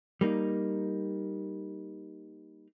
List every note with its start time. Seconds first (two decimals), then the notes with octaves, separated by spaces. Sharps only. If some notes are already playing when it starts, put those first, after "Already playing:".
0.21 G3 A#3 D#4